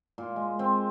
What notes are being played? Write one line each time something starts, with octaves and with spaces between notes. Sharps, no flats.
A#2
G#3
C4